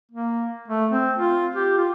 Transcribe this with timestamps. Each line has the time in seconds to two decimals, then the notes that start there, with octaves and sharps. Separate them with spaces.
0.12 A#3
0.68 A3
0.91 C4
1.17 F4
1.56 G4
1.78 F4